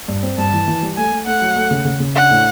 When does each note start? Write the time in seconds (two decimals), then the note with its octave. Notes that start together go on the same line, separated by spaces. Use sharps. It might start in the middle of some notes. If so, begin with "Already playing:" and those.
0.08 G2
0.23 C4
0.38 G2 A5
0.53 E3
0.68 E3
0.82 G3
0.97 A3 G#5
1.12 A3
1.26 A3 F#5
1.42 F#3
1.56 A3
1.71 C#3
1.85 C#3
2.00 C#3
2.15 D4 F#5
2.30 A2